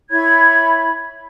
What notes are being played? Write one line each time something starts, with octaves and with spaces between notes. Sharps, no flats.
E4 C#5 B5 G#6